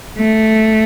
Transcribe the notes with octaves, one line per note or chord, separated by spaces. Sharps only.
A3